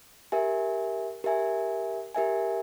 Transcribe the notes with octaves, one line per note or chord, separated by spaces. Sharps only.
G4 A#4 E5 G#5
G4 A#4 E5 G#5
G4 A#4 E5 G#5